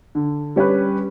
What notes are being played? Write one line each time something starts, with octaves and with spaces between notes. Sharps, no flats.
D3
G3 C#4 G4 B4